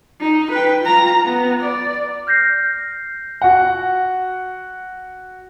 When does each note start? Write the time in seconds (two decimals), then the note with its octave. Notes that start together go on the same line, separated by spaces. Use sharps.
0.20 D#4
0.52 B4 G5
0.82 F4 A#5
1.24 B3
1.61 D5
2.27 F6 G6 A#6 C7
3.42 F#4 F#5